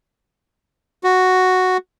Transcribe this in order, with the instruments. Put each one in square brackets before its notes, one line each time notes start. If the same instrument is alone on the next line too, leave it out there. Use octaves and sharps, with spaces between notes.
[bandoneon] F#4